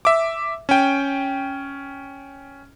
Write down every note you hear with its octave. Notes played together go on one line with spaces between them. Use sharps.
E5 D6
C#4 G5